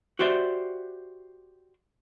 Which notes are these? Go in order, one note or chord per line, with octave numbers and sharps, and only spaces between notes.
F#4 G4 C5 D5 E5